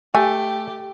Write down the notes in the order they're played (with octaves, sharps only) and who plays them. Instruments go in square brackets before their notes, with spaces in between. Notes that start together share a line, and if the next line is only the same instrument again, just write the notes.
[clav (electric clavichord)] A3 [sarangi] G4 [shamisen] G#5